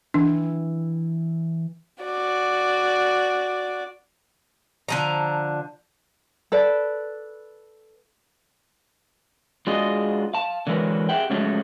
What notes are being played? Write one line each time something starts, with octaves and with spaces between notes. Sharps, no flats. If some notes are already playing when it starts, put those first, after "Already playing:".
E3 D4
F#4 D5
D3 F3 A#5
A4 B4 D5
G#3 D4 F4 F#4 G#4 D#5
F5 A5
D3 E3 F#3 G#3 A#4 B4
G4 G#4 E5 F#5 G5
C#3 F3 F#3 G#3 A3